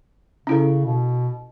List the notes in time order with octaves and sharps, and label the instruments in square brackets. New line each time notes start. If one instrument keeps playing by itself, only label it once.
[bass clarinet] C#3 [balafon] C#4 E4 A4
[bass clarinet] B2